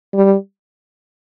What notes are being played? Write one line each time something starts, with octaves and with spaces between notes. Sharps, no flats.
G3